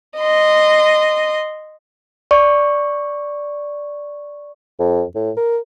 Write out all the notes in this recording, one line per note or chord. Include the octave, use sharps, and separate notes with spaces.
D#5 C6
D5 C#6
F2
A2
A#4